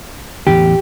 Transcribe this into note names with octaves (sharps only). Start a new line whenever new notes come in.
A1 E2 D3 G4